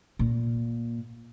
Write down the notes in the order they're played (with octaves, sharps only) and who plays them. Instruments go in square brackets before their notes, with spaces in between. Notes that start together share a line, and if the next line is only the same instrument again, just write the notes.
[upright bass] A#2